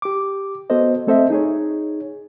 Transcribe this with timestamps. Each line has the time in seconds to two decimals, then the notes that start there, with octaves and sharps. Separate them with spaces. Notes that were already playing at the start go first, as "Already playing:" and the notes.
0.02 G4 D6
0.70 B3 F#4 A4 C5 D#5
1.07 A3 C4 A4 C5 D#5 E5
1.30 D#4 G#4 C#5